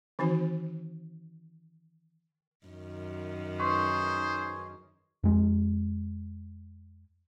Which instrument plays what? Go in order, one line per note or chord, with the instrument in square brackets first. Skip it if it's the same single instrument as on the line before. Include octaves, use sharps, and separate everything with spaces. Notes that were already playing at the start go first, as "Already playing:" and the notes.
[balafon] D#3 E3 C4 D#4 F#4 C5
[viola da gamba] F#2 D#3
[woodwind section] C#4 D#4 G#4 [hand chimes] B4 C6 C#6 [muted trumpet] C5
[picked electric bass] F2 G#3